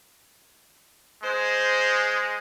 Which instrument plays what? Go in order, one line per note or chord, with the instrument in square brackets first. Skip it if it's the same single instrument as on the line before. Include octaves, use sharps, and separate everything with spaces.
[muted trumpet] G#3 [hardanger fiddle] C5